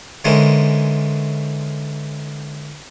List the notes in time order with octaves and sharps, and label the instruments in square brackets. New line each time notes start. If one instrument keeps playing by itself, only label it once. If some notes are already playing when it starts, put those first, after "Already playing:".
[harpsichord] D3 E3 G#3 C4 C#4 A#4